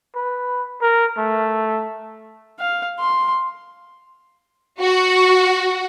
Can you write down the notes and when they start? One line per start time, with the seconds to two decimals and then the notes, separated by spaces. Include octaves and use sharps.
0.15 B4
0.82 A#4
1.17 A3
2.60 F5
3.00 C6
4.81 F#4